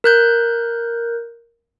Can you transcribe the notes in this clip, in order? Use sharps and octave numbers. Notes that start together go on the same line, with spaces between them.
A#4 F#6 G6